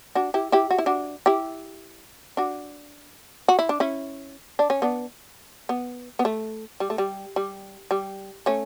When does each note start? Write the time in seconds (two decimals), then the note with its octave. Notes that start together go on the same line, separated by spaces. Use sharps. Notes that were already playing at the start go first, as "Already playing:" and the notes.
0.15 D4 F#4
0.34 E4 G4
0.52 E4 G4
0.71 F#4
0.78 E4
0.86 D4 F#4
1.26 E4 G4
2.37 D4 F#4
3.48 F#4
3.59 E4
3.69 D4
3.80 C#4 E4
4.59 D4
4.70 C#4
4.82 B3 D4
5.69 B3
6.19 B3
6.25 A3
6.80 G3
6.90 A3
6.98 G3
7.36 G3
7.91 G3
8.46 A3 C#4